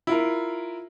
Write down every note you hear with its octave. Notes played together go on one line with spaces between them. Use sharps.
E4 F4 A#4